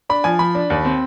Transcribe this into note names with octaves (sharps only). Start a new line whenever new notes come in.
D4 B5
F3 G#5
F3 B5
D4
D#2
C4